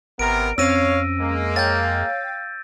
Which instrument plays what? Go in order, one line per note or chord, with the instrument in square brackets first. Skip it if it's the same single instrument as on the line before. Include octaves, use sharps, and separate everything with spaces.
[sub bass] G#1 [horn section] C3 B3 A#4 [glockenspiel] D7
[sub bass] F2 [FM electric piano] C4 C#4 [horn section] C#5 F5 [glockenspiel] E6 A#6 D#7
[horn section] G#3 A#3
[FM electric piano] C#5 F5 G5 [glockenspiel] G6 A6